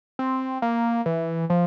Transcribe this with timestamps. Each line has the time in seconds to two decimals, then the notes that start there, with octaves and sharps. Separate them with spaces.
0.19 C4
0.62 A#3
1.06 E3
1.50 F3